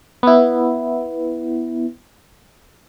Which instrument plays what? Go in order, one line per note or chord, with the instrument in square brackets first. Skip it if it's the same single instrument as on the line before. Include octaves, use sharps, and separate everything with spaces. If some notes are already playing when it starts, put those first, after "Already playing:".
[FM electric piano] B3 E4